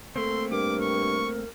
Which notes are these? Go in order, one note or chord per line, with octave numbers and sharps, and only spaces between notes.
A3 A#3 C4 A4 C6
G2 A#4 D6
C#6